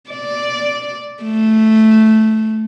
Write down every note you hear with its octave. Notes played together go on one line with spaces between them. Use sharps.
D5
A3